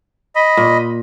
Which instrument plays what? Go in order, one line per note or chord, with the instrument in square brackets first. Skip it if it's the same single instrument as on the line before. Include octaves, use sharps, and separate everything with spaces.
[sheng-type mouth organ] D#5 B5
[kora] A#2